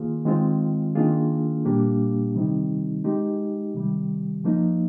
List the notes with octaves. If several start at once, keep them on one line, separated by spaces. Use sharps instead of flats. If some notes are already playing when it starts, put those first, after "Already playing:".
Already playing: D#3 A#3 F4 G#4
D#3 G#3 C4 F4
D#3 A#3 D4 F4 G#4
A#2 G3 A#3 D4 G4
C3 D#3 G3 C4 D#4
G#3 D#4 G4
C3 D#3 G3
F3 A#3 D#4